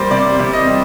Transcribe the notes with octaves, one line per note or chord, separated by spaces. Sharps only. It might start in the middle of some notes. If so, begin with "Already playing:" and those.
Already playing: G3 A#3 C5 D5
C3 D5
C3
D#5
G3